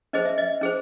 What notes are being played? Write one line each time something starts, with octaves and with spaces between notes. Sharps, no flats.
C#4 G#4 C5 D#5
E5
D#5
C#4 G#4 C5